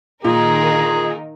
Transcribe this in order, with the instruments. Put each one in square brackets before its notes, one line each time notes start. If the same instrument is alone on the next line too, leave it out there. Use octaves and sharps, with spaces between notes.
[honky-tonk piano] A#2 [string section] D#3 D#4 A#4 [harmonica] G#4 [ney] A#5